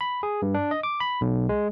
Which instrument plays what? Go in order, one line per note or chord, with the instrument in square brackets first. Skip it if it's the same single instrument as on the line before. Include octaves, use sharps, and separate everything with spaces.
[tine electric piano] B5
G#4
G2
D4
D#5
D6
B5
B1
G#3